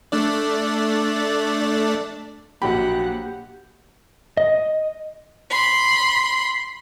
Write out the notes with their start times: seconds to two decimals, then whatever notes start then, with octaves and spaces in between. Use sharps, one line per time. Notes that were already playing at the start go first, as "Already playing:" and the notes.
0.12 A3 D4 D5
2.62 A#1 F#3 A#3 G4 F#5 B5
4.37 D#5
5.51 B5 C6